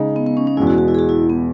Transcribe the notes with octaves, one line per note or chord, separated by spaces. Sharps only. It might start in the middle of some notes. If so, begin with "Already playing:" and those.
Already playing: C#3 G#3 D#4
B3
B3
C#4
C#4
E2 B2 G#3 E4
F#4
F#4
E4
G#4
F#4
E4
B3